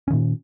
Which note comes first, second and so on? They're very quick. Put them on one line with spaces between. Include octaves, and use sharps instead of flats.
C#4 D#3 A#2